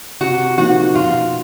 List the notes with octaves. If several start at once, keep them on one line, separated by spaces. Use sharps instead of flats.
C3 F#4
F3 A#3 D#4 F#4
B2 F4